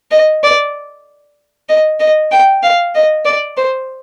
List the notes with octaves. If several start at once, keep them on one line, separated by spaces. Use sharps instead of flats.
D#5
D5
D#5
D#5
G5
F5
D#5
D5
C5